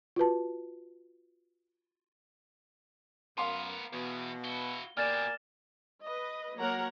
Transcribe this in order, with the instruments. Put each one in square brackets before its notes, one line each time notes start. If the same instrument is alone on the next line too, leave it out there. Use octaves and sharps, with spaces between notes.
[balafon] F4 F#4 B4 A5
[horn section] F#2 [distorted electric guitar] B3 A#4 [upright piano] F5 C6
[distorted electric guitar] E2 [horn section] B2
[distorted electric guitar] E4 F#4 [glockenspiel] G7
[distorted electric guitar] B2 G4 [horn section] A#3 G#5 [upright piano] D5 [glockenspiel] F6 A6 E7
[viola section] B4 D#5
F#3 A#3 A#4 C#5 F#5 A#5